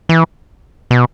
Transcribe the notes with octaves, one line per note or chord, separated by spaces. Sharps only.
E3
B2